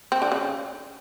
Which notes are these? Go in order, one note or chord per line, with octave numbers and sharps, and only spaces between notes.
C4
D3
C#3